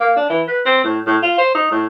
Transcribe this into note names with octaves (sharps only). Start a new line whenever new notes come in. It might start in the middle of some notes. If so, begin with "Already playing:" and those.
A#3
D4
E3
B4
C4
A2
A2
F4
C5
D#4
A2